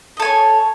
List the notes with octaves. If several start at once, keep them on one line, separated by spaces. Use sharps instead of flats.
A4 C#5 D#5 G#5